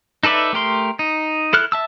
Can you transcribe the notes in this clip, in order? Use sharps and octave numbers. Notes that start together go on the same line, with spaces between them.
D#4 A4 B4 D5 E5
A3 G4 A#4 C6
D#4
E4 A4 F6 F#6
E5 A5 E6